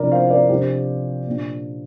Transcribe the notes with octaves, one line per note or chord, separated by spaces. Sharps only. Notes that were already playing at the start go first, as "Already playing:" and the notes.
Already playing: C3 F3 D4 A#4 D5
C5 F5
A#4 D5
C3 F3 D4 G4 C5
A#2 A#3 D4